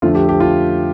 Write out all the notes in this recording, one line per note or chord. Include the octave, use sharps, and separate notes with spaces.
F2 D3 A3 F4
G4
G4
F4